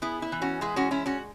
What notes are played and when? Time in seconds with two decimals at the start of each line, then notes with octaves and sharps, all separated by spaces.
0.02 B3 E4 G#4
0.22 E4
0.32 E3
0.42 C#4 F#4
0.61 G#3 E4 G#4
0.76 C#4 F#4
0.91 C#4 E4
1.06 C#4 F#4